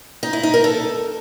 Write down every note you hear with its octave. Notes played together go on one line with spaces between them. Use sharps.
D#4
E4
D#4
A#4
A4